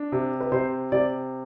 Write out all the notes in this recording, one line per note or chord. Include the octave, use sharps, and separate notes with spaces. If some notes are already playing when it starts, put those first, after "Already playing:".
Already playing: D4
C3
B4
C3 C5
C3 D5